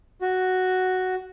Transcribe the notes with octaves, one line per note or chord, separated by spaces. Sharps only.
F#4